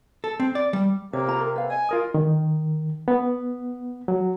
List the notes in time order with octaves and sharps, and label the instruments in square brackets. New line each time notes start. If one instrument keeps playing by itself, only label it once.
[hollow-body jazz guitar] A4
C4
D5
G3
[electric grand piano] C3 [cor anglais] A#3 [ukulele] C#5
[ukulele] F4 A#5
A#4
B4 F5
[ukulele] D#5 [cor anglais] G#5
[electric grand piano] F4 A#4 D#6
[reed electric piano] D#3
B3
F#3